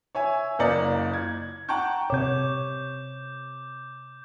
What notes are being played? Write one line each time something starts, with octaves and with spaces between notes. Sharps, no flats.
C#5 E5 G#5
F#1 A#3 A#4 D5 D#5 C#7
G#6
F#5 G5 A5 A#5 C#6 G6
C3 C#5 D6 G6